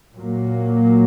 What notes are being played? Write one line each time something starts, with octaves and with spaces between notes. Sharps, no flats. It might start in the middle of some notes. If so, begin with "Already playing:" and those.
A#2 F#3 A#3